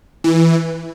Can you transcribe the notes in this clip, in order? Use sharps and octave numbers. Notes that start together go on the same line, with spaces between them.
E3